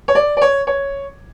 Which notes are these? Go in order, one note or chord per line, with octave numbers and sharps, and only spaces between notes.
C#5
D5
D5
C#5
C#5